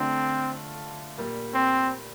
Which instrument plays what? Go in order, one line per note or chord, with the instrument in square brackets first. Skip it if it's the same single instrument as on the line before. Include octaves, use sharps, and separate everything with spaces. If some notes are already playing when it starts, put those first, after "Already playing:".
Already playing: [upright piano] D3 A3 D4 F4 [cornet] C4
[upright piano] A#2 G3 A#3
[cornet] C4